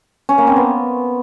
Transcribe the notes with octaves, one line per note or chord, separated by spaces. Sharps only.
C#4
A#3
C4
B3